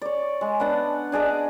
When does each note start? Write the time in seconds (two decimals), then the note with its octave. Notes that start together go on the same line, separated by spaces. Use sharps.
0.02 C#5 D5
0.41 G#3
0.60 B3 D4 F#5 A5
1.12 D4 G#4 D5 D#5